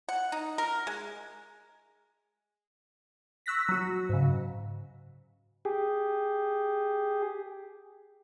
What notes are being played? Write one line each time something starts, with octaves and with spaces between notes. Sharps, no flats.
F#5
D#4
A#4
G#3
C#6 E6 F#6 A#6 B6
F#3 F#4
G#2 C#3
G4 G#4